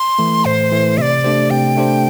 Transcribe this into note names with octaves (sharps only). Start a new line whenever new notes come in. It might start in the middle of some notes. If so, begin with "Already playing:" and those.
Already playing: C6
E3 A3
A2 C5
E3 A3
C3 D5 E5
A3 D4 G4 C5
C3 G5
A3 D4 G4 C5